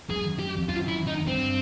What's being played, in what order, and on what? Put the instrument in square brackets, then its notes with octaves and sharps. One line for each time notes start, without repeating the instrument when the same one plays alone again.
[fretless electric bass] F#2 [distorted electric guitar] G#4
[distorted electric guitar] G4
[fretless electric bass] F2
[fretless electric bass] F#2 [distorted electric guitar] F4
[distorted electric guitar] E4
D#4
[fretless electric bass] G2 [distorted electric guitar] C4